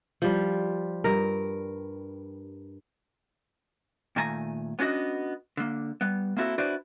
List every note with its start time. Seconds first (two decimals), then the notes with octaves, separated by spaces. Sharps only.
0.22 F3 G3
1.04 G2 A#4
4.16 A#2 D#3 A3 G#5 A#5
4.79 B3 C#4 D4 F#4 D#5
5.57 D3 A#3
6.01 G3 B3
6.37 A#3 C4 E4 F#4 A4
6.58 D4 E4 F#4 B4 C5 D5